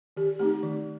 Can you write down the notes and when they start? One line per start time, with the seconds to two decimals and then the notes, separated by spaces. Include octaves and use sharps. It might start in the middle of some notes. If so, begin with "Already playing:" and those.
0.17 D#3 G4
0.39 A3 C4 D#4 G4
0.63 D#3